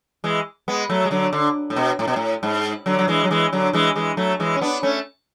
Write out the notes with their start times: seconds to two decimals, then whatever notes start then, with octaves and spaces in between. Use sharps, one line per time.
0.24 E3 G#3
0.68 G#3 B3
0.89 F#3 A3
1.05 G#3
1.11 D3 F#3
1.33 D3
1.70 A2
1.76 B2
1.99 A2
2.08 B2
2.16 A2
2.43 G#2
2.86 D3 F#3
2.99 F#3
3.08 E3 G#3
3.24 F#3
3.30 E3 G#3
3.53 D3 F#3
3.73 E3 G#3
3.96 E3 G#3
4.17 F#3 A3
4.40 E3 G#3
4.55 C#4
4.61 B3 D4
4.83 A3 C#4